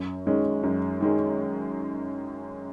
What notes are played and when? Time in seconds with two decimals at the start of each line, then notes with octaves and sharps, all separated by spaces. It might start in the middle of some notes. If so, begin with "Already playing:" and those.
Already playing: F#2
0.25 D#3 G#3 C#4
0.63 F#2
1.00 D#3 G#3 C#4